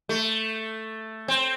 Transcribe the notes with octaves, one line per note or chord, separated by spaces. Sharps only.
A3
C4